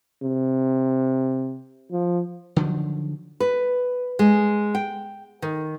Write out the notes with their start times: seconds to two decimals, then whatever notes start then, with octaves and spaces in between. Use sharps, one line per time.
0.23 C3
1.92 F3
2.56 D3 D#3 F3 F#3
3.40 B4
4.19 G#3
4.75 G5
5.42 D#3